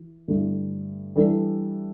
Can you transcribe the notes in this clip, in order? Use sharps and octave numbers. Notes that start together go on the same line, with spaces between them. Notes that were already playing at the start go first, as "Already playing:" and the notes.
Already playing: E3
G2 D3 A3 E4
E3 G3 D4 A4